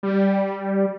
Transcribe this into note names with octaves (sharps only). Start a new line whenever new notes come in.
G3